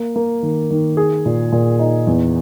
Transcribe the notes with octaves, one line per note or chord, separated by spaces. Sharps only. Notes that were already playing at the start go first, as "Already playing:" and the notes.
Already playing: A#3
A#3
D#3
D#3
G#4
A#2
A#2
D#4
E2